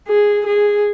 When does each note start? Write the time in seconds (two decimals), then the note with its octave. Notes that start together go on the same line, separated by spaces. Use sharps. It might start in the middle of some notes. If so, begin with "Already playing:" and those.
0.08 G#4
0.47 G#4